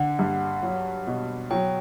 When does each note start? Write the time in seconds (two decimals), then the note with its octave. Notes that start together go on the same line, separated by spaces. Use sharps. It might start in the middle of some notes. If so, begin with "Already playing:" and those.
Already playing: D3 F#5
0.19 G2
0.63 F#3
1.07 B2
1.51 F#3 G5